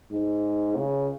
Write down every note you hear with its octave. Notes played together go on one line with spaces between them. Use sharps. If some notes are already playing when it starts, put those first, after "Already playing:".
G#2
C#3